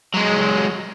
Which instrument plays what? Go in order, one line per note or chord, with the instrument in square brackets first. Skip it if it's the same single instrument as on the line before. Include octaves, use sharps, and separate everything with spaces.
[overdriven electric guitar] F#3 G#3